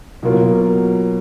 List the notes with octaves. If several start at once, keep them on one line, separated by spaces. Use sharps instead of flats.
B2 F#3 A#3 F4 A#4